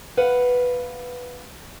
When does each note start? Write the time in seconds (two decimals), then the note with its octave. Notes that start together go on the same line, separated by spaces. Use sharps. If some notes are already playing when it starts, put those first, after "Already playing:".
0.17 B4 F5 F#5